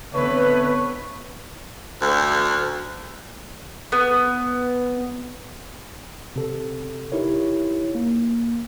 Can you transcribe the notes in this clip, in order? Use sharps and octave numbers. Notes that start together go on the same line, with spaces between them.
D3 A3 B3 C4 B4 C#5
D2
B3
C3 A4
D#4 E4 G4 A#4 C#5
A#3